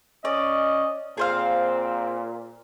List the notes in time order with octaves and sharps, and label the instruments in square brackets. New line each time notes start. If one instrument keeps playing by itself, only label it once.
[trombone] C#4 [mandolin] D5 [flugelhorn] D#5
[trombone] A#2 [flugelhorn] C4 [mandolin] G#4 C5 F5